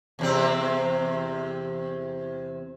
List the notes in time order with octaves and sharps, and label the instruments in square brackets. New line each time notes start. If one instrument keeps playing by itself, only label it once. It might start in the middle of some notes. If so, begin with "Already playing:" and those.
[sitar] E2 C3 C4